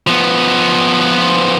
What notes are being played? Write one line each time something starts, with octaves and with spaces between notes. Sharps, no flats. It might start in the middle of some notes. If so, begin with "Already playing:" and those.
F3 B3